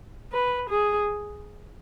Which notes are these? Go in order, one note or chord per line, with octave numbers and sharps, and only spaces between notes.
B4
G#4